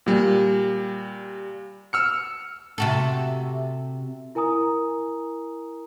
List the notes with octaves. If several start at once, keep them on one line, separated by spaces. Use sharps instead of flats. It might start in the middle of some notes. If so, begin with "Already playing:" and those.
A#2 G3
E6 F6 C#7
C3 F#4 A4
E4 A#4 G#5 A#5 D#6